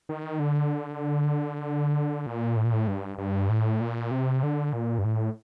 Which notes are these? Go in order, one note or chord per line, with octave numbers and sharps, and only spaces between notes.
D#3
D3
A#2
A2
A#2
A2
G2
G2
A2
A#2
C3
D3
A#2
G2
A2